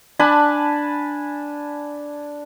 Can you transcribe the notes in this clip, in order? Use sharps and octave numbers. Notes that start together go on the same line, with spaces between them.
D4 G#5 A5 B5